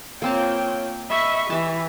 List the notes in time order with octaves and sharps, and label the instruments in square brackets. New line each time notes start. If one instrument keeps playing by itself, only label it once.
[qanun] A#3 C4 A5 [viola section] F4 C#5 G5
[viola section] D#5 [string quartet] E5 B5 C#6
[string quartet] E3 [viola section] G4 [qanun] E5 A5